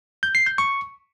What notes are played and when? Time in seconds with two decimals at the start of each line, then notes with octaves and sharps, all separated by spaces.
0.23 G6
0.35 C7
0.46 G6
0.58 C#6